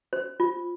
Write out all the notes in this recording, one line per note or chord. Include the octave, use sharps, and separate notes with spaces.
C5
F4